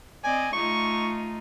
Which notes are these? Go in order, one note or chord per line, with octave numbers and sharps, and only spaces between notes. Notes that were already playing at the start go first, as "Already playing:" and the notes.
C4 D5 D#5 G#5
A3 D#4 F4 C#6